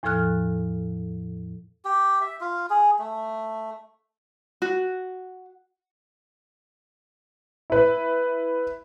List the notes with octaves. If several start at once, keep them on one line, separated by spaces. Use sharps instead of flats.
E2 A2 F3 A4 F6 F#6
G4
E5
F4
G#4
A3
F#4
E4 B4